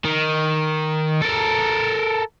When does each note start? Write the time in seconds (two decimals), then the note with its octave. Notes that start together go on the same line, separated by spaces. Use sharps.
0.05 D#3
1.22 A4 A#4